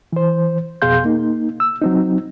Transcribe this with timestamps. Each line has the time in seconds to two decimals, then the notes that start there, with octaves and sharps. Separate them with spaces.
0.13 E3 C5
0.82 F2 B2 G#4 F5 C6 G6
1.05 A#3 D#4
1.60 E6
1.81 F#3 C4 D#4